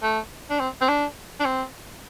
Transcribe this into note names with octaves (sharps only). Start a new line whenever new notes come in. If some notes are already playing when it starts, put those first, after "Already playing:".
A3
D4
C4
C4
D4
D4
C4